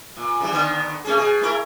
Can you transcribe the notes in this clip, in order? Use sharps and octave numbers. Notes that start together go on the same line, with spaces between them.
A#2
C#3 E3 G3
D3 D#3 B3
A3 C#4 G#4
B2 G#4
A3 E4 A#4